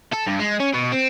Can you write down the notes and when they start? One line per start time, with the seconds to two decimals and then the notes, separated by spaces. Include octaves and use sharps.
0.13 A4
0.27 G2
0.40 G#3
0.60 C#4
0.74 B2
0.92 C4